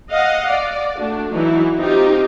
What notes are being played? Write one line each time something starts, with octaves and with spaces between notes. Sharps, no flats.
D#5 F5 F#5
D5
A3 D4 F#4
E3 F#3 D#4 E4
C4 D#4 F4 G4